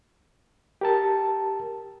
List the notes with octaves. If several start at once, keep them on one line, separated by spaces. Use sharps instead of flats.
G4 A#4 A5